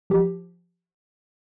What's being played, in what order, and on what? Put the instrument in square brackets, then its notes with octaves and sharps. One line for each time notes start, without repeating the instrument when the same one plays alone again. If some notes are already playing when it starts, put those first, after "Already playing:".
[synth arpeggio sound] F3 G4